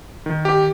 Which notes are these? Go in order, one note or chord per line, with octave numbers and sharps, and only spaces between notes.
D#3
G4